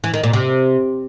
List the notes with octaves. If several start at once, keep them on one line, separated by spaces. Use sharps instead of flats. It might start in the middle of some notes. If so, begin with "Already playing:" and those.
E3
D#3
A#2
C3